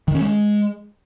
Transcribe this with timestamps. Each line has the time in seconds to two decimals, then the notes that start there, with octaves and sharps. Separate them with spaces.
0.08 D#3
0.14 C#4
0.21 G#3